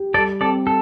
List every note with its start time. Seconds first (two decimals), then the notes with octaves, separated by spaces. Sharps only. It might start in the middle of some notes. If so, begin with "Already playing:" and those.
Already playing: G4
0.14 G3 A4 D5
0.40 C4 A4 D5
0.67 A4